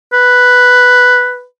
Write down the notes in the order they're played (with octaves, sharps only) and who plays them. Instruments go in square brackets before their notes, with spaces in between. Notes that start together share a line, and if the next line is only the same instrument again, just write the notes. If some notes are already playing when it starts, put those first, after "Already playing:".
[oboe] B4